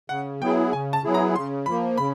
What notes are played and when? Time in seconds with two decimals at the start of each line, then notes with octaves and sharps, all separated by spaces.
0.09 C#3 F#5
0.41 F#3 B3 E4 G#4 G5
0.72 C#3 G#5
0.93 A5
1.04 F#3 B3 E4 G#4
1.14 A#5
1.35 C#3 C6
1.66 F3 A#3 B5
1.98 C#3 B5